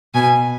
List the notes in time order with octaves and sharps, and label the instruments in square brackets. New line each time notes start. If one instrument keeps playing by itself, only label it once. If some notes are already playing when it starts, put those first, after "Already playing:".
[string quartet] B2 [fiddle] G#5